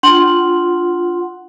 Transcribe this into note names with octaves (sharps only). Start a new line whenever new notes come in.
D4 F4 F#5 C6 F#7